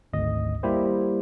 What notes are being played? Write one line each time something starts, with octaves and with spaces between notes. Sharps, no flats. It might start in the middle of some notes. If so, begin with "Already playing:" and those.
G#1 D2 D#5
G3 A#3 E4 G4 C5